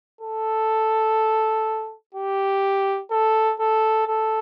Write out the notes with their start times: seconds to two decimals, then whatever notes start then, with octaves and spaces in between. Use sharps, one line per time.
0.21 A4
2.15 G4
3.11 A4
3.60 A4
4.08 A4